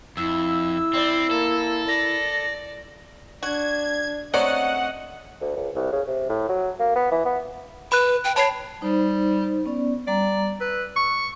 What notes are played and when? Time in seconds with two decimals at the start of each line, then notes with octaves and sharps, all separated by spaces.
0.17 F2 E4 E6
0.94 C4 D5
1.31 A#3 A4
1.88 D5 A#6
3.43 D4 F#4 G#6
4.34 F#3 G#3 A3 C4 C#4 D5 D#5 F#5
5.41 D2
5.56 C#2
5.75 C2
5.92 C#3
6.07 C3
6.29 A2
6.49 F#3
6.79 A#3
6.96 B3
7.11 E3
7.25 B3
7.92 B4 B5 F#6
8.24 G5
8.36 C#5 A5 B5 C7
8.82 G3 D#4 C5
9.66 B3 C#4 D5
10.07 G3 D5 A#5
10.60 B4 E6
10.96 C#6